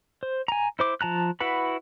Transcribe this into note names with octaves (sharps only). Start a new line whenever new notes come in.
C5
G#5 A#5
E4 C5 D6
F3 A5 A#5 F#6
E4 F#4 B4 F#5 B5